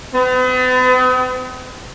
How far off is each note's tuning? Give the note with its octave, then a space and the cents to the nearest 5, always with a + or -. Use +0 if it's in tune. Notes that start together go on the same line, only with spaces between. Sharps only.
B3 +45